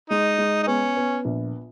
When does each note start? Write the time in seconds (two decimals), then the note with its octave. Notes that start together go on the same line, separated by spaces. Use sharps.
0.10 G#3 D#4
0.38 G#3
0.63 D#4
0.67 B3 C#4
0.97 B3
1.25 A#1